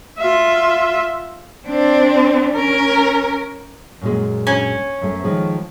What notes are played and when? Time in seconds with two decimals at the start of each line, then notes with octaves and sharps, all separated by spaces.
0.18 F4 E5
1.68 C4 D4
2.52 C#4 A#4
4.01 F#2 A#2 G#3
4.47 C#4
5.01 F#2 A3
5.24 D#3 F3 G#3